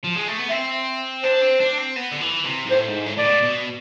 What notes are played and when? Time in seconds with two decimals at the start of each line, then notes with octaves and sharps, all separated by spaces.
0.04 F3
0.16 G#3
0.27 A3
0.39 B3
0.49 C4 E5
1.23 D4 C5
1.42 C4
1.60 D4
1.78 C4
1.97 B3
2.12 D3
2.22 E3
2.45 C3
2.66 G#2
2.70 A2 C5
2.89 G#2
3.06 A2
3.17 A2 D5
3.25 B2
3.43 B2